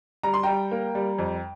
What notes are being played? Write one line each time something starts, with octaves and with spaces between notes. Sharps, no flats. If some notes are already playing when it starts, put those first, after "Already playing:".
G3 A#5
C6
G3 G5 A#5
A#3
G3
F2